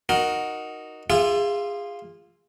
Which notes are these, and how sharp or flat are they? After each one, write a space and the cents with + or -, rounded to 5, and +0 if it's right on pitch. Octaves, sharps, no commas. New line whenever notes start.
D#4 +0 F#4 +0 A#4 +0
F4 +0 G#4 -25 E5 +25